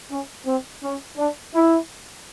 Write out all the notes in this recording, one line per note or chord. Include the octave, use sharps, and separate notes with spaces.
C#4
C4
C#4
D4
E4